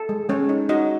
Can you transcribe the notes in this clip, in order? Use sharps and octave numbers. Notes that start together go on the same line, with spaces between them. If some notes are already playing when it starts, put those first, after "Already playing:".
Already playing: A4
G#3
G#3 C#4 C#5
D#4
D#4 F#4 D#5